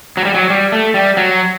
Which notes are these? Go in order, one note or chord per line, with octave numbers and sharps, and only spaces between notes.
F#3
G3
F#3
G3
A3
G3
F#3